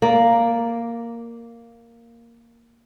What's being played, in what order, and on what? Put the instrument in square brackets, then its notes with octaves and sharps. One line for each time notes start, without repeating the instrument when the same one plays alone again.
[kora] A#3 D5